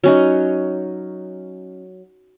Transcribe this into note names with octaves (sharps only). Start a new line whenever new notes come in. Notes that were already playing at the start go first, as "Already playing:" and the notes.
F#3 C#4 D#4